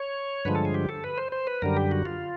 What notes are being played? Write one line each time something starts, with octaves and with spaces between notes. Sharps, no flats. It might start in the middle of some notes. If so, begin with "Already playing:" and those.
Already playing: C#5
G2 D3 F3 G#3 B4
A4
G#4
G4
A4
B4
C5
C5
B4
F#2 D3 G3 A#4
G4
F#4
F4